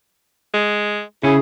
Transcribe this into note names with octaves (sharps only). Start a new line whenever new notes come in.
G#3
C#3 C#4 E4 G#4